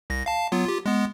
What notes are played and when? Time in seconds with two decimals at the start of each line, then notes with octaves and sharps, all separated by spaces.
0.10 C2 A#6
0.26 F5 A5
0.52 F#3 B3 F4
0.65 F4 G4
0.86 G#3 B3